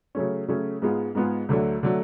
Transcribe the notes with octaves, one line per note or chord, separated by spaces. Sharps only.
C#3 F#3 A3 C#4
C#3 F#3 A3 C#4
G#2 G#3 B3 F4 G#4
G#2 G#3 B3 F4 G#4
D2 D3 F#3 A3
D3 F#3 A3